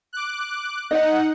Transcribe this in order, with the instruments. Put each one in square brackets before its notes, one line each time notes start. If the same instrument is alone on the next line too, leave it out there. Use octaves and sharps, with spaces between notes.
[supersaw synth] D6 F#6
[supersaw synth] D#4 F#5 [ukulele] D#5